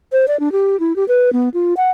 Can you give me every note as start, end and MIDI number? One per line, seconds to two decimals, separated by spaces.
0.12 0.26 72
0.28 0.39 74
0.40 0.52 62
0.52 0.79 67
0.80 0.95 64
0.96 1.06 67
1.08 1.33 71
1.33 1.49 59
1.54 1.74 65
1.77 1.90 78